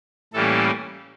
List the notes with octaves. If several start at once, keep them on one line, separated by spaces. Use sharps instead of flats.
A2 E3 G3 A#3 C#4 A4